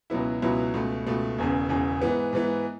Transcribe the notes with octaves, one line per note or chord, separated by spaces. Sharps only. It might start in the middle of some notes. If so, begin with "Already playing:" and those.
C#2 B2 F#3 B3 E4
C#2 B2 F#3 B3 E4
C#2 B2 A3
C#2 B2 A3
E1 E2 C#3
E1 E2 C#3
G#2 E3 B3
G#2 E3 B3